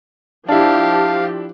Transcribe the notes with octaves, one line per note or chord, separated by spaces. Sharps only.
F3 D4 E4 G4 F5 A5